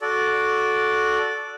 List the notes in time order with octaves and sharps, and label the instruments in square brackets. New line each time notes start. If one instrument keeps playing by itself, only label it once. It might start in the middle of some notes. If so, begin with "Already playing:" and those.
[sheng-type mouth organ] F#4 A4 D5